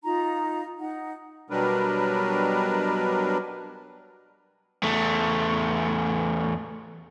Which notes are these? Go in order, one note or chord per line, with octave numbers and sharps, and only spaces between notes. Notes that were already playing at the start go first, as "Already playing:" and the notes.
D#4 F4 A#5
D#4 F#5
B2 F#3 G3 D4 A#4 B4
E2 A3